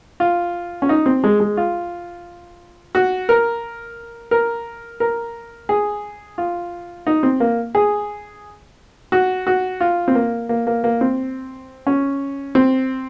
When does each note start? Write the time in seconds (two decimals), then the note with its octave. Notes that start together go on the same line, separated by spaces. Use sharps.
0.20 F4
0.82 C#4
0.89 D#4
1.06 C4
1.24 G#3
1.40 G#3
1.57 F4
2.95 F#4
3.29 A#4
4.31 A#4
5.00 A#4
5.69 G#4
6.38 F4
7.07 D#4
7.23 C4
7.40 A#3
7.75 G#4
9.12 F#4
9.47 F#4
9.81 F4
10.08 C4
10.15 A#3
10.49 A#3
10.67 A#3
10.84 A#3
11.01 C4
11.87 C#4
12.55 C4